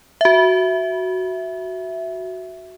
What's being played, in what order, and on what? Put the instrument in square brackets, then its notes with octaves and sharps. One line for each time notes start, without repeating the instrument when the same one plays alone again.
[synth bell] F#4 E5